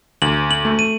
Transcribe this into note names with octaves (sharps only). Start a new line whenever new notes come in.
D2 F#7
F#7
A3
D#7